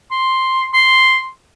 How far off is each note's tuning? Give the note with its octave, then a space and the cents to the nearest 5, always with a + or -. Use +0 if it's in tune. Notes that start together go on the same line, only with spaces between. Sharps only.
C6 +5
C6 +0